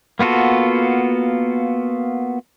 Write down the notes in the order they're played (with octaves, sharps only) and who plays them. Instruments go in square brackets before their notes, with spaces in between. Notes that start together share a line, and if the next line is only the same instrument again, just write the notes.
[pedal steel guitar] A#3 B3 F4 F#4 A4